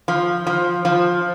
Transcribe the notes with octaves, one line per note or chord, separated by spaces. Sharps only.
F3
F3
F3